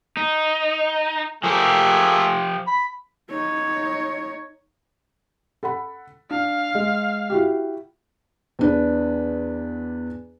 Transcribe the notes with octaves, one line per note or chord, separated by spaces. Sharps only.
D#4
F3 A3 A#3 G4 G#4
B5
D#4 C#5
A4 F#5 B5
D4 F5
G#3
E4 F#4 G4
E2 D4 B4